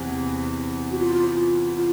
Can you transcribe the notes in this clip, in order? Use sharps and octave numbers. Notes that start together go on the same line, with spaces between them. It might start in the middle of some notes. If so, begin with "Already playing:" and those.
Already playing: E2 C3 E3
F#4
F4
F4